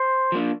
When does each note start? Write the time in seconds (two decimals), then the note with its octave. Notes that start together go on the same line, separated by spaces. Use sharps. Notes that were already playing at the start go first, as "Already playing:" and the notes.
Already playing: C5
0.32 F3 A#3 D4